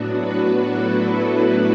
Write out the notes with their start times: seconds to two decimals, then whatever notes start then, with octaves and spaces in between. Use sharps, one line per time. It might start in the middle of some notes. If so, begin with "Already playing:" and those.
Already playing: A2 F#3 B3 D4 F#4
0.17 F#4 B4
0.66 E4 A4